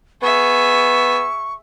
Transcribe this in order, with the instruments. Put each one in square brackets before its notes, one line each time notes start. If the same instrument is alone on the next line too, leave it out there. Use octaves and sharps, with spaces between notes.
[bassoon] B3 [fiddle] G#4 E5 [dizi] C#6